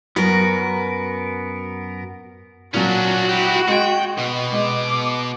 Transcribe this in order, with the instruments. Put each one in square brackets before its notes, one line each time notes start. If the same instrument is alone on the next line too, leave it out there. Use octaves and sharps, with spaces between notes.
[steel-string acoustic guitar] F#2 F#4 [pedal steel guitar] B3 A#4
[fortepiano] A#2 F#3 [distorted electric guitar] C#4 D4 [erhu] F#4
[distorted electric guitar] E4 G4
[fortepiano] G#3 [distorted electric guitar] F#5 G5
[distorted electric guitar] B2
[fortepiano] G#3 [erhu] D6